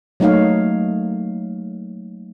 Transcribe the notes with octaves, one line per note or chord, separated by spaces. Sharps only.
F#3 A3 A#3 D#4 C#5 F5